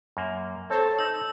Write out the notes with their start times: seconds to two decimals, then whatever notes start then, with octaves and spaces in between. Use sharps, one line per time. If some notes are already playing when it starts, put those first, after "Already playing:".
0.17 F#2 A#3
0.70 C4 A4 C5 C#5 A5
0.99 D#4 E6